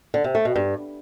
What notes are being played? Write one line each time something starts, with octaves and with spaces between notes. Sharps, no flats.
D3
C3
A3
B2
G2